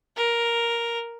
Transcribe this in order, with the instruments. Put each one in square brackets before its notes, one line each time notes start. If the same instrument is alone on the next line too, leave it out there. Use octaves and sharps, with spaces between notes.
[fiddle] A#4